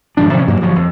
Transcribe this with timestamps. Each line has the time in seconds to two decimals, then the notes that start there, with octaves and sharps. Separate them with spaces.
0.17 D1 G#2 F3 D4
0.34 C3 F3 G#3 C#4
0.48 G2 F#3 A#3
0.61 G1 F3 F#3
0.76 F2